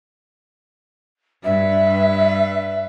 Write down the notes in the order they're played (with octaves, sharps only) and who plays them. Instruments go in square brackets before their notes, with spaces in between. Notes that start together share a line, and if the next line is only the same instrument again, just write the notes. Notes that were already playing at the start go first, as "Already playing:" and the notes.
[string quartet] G2 B4 [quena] E5